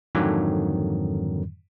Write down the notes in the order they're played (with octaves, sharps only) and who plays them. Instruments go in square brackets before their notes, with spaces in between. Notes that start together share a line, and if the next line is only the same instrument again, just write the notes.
[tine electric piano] F2 G#2 D3 D#3 F#3